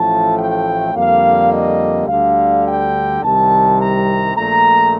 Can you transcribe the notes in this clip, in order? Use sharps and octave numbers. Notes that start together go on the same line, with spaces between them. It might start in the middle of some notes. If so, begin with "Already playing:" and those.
Already playing: A1 A2 F3 A3 A5
G5
F2 D3 G3 A#3 F5
D#5
D2 D3 G3 F5
G5
C2 C3 D#3 G3 A5
A#5
A#1 A#2 A3 A#5